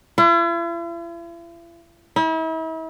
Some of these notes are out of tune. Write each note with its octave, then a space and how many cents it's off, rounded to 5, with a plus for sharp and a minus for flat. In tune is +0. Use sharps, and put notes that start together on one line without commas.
E4 +45
E4 -40